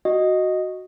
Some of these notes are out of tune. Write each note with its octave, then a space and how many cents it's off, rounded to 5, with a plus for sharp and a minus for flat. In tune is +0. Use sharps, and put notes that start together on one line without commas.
F#4 +0 D#5 +0